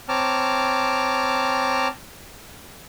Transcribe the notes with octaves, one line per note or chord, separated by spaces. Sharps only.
C4 C#5 A5 A#5 D6 F6